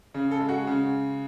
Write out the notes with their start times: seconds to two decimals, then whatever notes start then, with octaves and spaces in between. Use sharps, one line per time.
0.15 C#3
0.31 A4
0.40 G#3
0.49 F#4
0.67 C#3